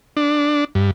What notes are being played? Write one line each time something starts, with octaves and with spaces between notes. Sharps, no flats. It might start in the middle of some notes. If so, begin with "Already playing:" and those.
D4
G2